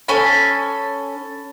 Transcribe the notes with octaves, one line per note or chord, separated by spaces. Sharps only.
C#4 A4 G#5 B5